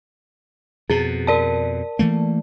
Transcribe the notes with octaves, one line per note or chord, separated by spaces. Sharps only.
F2 B2 G#4
A#4 D5 A5
E3 A3 A#3